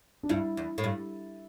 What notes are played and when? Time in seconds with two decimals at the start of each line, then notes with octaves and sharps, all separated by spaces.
0.23 D4
0.29 G2 E4
0.57 E2
0.78 A2
0.84 G2